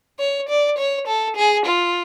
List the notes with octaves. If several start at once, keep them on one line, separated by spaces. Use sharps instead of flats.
C#5
D5
C#5
A4
G#4
F4